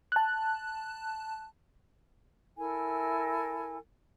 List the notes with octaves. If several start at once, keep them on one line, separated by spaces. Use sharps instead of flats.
A5 F#6
E4 A4 A#4 G#5